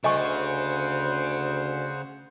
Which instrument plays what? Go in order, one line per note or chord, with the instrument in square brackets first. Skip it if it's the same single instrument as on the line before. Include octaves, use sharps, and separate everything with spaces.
[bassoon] D2 [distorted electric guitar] C#3 [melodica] C5 F#5 [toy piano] D#5 G#5 C#6